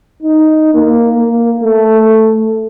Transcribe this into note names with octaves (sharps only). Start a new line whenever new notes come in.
D#4
A#3
A#3
A3